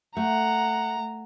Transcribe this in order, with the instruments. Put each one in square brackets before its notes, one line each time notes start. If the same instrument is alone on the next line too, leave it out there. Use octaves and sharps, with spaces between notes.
[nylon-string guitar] A3 [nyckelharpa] F#5 [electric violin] A#5